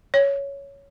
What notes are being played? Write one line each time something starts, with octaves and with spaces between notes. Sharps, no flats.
C#5